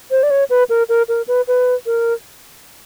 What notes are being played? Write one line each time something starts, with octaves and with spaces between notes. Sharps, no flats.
C5
D5
C#5
B4
A#4
A#4
A#4
B4
B4
A#4